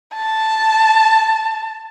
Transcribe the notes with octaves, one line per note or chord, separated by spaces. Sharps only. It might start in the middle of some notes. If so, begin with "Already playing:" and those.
A5